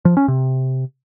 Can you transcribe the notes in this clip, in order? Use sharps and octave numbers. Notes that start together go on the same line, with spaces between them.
F3
C#4
C3